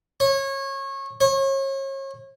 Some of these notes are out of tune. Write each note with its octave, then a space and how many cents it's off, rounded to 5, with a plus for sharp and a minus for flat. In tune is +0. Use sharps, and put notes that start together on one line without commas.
C#5 -25
C#5 -35